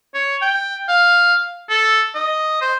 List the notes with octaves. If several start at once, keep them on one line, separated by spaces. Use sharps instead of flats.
C#5
G5
F5
A4
D#5
C5